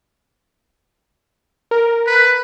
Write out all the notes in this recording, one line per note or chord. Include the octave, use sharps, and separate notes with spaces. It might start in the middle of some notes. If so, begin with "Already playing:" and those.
A#4
B4